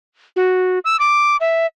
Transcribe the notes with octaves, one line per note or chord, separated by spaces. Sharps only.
F#4
E6
D6
E5